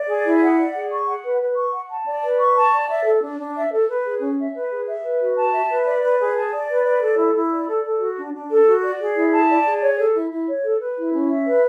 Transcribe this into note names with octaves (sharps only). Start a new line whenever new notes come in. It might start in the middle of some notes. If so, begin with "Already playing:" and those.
Already playing: D5
G#4
E4
F#5
D5
G#4
C#6
F#5
B4
B4
C#6
F#5
A5
D5
B4
C#6
A5
D5
E5
A4
D4
D4
E5
A4
B4
G#4
C#4
E5
B4
G#4
E5
B4
F#4
A5
E5
B4
D5
B4
G#4
A5
D5
B4
D5
A4
E4
E4
D5
A4
A4
F#4
D4
D4
A4
F#4
D5
G#4
E4
A5
D5
G#4
C#5
A4
E4
E4
C#5
A4
B4
E4
C#4
E5
B4